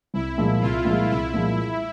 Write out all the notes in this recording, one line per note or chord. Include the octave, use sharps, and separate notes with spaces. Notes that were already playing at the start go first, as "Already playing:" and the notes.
C2 E4
A#2 F3 G#3
C2 F4
A#2 F3 G#3
C2 E4
A#2 F3 G#3